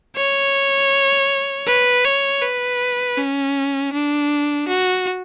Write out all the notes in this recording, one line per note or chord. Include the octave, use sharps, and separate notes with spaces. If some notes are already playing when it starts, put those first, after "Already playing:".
C#5
B4
C#5
B4
C#4
D4
F#4